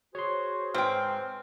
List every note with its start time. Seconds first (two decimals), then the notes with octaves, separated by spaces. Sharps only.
0.15 F#4 G#4 C5 C#5 C6
0.74 G#2 C4 B4 C5 G5 F6